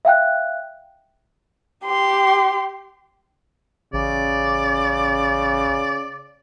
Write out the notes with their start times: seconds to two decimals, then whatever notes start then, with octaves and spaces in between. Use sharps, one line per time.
0.05 E5 F5 G5 F#6
1.86 G4 C6
3.93 A1 C#3 D5